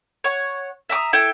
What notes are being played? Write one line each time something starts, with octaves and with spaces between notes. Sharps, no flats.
C#5 F#5
E5 A#5 D6 D#6
E4 A4 G5